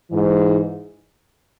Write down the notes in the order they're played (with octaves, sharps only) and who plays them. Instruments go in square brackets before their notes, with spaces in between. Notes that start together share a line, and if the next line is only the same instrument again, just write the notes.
[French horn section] G#2 E3